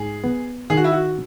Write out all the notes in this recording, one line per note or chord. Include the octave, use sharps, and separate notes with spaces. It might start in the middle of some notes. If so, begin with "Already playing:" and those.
Already playing: G#2 G#4
B3
D#3 G#4
F#4
E4
F#4